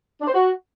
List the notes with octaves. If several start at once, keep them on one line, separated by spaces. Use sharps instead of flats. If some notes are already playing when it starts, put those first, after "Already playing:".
D4
C5
F#4